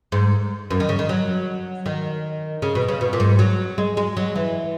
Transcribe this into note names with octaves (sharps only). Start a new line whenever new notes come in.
G#2
F#2
D#3
C#3
D#3
F#3
D#3
C#3
B2
C#3
B2
A#2
G#2
F#3
G#3
G#3
F#3
E3